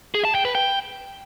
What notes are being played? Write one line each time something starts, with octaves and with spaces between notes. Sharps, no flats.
G#4
A5
G5
B4
G5